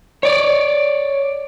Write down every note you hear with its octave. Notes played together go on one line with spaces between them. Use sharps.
C#5 D5